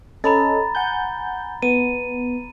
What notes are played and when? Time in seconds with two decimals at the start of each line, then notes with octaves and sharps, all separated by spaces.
0.24 C#4 A4 D#5 A#5 B5 A6
0.75 F#5 G#5 G6
1.62 B3 D#7